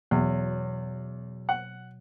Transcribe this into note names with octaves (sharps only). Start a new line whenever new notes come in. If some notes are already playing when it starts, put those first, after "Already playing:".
E2 B2 F#3
F#5